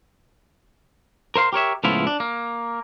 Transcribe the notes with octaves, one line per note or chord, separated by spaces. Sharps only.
A#4 C5 F5 C6
G4 A#4 C#5 E5
C#2 A2 F3 B3 E4 F4
D4
A#3